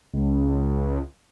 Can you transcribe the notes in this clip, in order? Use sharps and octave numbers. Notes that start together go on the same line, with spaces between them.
C#2